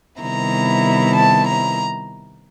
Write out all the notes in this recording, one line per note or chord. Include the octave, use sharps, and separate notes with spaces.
C3 D#3 G3 B3 E4 A#5
A5
A#5